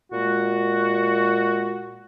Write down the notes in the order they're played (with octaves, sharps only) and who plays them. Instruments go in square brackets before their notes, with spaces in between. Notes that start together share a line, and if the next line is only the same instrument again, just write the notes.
[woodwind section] A#2 G#3 F#4